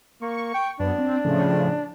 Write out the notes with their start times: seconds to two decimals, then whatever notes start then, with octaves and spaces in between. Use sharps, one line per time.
0.21 A#3 C#6
0.54 G5
0.80 F#2 B3 D4
0.98 C4
1.24 A2 C#3 F3